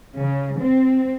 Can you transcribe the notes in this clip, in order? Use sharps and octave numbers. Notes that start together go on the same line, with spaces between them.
C#3
C4